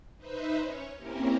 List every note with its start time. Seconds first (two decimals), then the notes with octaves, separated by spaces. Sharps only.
0.17 D#4 B4 C5 E5
0.57 C#4 C#5
0.96 A#3 C4 C#4 E4 G4 A#4